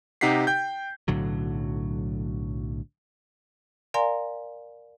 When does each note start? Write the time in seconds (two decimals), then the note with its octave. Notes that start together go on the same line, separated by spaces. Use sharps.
0.21 C3 D#4 G4 F#5 B6 C7
0.47 G5 G6
1.08 B1 A2 D3 F#3
3.94 A#4 D5 F5 G#5 A#5 C6